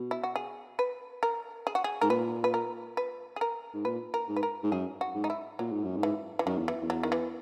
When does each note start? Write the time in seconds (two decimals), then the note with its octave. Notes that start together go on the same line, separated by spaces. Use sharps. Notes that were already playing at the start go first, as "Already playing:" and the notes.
Already playing: B2
0.11 E4
0.23 F#4
0.36 G#4
0.79 B4
1.23 A#4
1.67 G#4
1.75 F#4
1.84 G#4
2.01 G#2 A#4
2.10 A#2 B4
2.44 B4
2.54 A#4
2.97 B4
3.36 G#4
3.41 A#4
3.74 G#2
3.85 A#2 B4
4.14 A#4
4.28 G#2
4.36 B4
4.43 A#4
4.64 G#2
4.72 F#2 G#4
5.01 F#4
5.15 G#2
5.24 D#4
5.30 E4
5.59 A#2 F#3
5.72 G#2
5.84 F#2
5.97 G#2
6.03 E3
6.39 E3
6.46 F#2 D#3
6.58 E2
6.68 E3
6.82 E2
6.90 F#3
7.03 D#3
7.12 E3